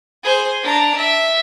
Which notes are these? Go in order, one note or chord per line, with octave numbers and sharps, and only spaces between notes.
G#4 C5
D4 A#5
E5